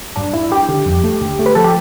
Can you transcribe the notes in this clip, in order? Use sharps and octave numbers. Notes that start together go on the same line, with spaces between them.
G2 D4
G2 E4
G2 G4
D3
F2
A3
D2
A3
B4
F3 A4
G4